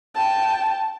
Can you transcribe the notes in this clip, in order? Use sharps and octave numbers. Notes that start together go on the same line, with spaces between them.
G5 A5